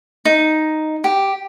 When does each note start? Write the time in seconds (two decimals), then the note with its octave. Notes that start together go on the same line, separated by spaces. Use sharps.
0.25 D#4
1.04 G4